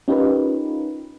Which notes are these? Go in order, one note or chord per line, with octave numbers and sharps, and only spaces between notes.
C#4 D#4 F4 G4 A#4 B4